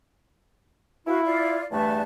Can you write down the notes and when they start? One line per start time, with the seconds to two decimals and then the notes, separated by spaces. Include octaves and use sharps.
1.07 E4 F#4 F5
1.25 F4 D5 F5
1.71 E2 G2 A3 B4 A5